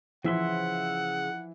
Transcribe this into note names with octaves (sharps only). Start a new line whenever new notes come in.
C#3 E3 F3 E4 E5 F#5 C6